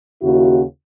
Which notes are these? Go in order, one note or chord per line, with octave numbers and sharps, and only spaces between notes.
D#2 C#3 E4 F#4